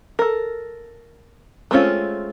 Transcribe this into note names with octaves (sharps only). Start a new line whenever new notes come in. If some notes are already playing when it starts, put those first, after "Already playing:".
A4 A#4
G#3 A3 C4 C#4 F4